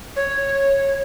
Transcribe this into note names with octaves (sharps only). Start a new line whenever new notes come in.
C#5